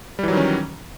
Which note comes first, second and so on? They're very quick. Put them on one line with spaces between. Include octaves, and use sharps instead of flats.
G3 E3 F#3 D#3 C#4